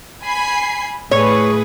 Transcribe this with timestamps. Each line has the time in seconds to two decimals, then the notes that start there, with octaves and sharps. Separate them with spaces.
0.23 G#5 B5 C7
1.11 A2 A3 G#4 B4 C#5